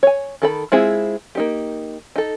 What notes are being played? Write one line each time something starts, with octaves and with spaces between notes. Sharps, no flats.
C#5 G#5
D#3 A4 B5
G#3 C4 E4 F4 G#4
A#3 D#4 G4
D#4 A4